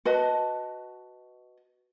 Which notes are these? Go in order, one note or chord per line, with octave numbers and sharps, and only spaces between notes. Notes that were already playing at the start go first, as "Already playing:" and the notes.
F#4 B4 D#5 A5